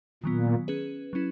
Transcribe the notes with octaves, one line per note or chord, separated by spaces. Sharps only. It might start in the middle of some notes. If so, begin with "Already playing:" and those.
A#2 D#3 F#3 B3
C#4 G#4 B4
F#3 C#4 E4